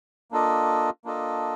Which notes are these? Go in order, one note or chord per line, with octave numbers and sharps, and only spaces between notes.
A#3 D4 F4 A4 D#5
A#3 D4 F4 A4 D#5